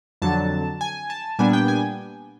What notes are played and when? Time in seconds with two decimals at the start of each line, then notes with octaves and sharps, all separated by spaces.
0.22 F2 D3 F#3 A5
0.81 G#5
1.10 A5
1.39 A#2 G3 B3 D4 G#5
1.53 G5
1.68 G#5